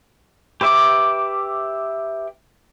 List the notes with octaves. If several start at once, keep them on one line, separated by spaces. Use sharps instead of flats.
G4 B4 E5 D6